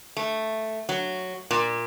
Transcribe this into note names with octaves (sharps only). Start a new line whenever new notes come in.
A3
F#3
A#2